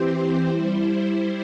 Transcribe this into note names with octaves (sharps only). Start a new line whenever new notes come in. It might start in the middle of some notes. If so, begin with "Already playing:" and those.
Already playing: E3 C4 G4 C5
G3 E4 C5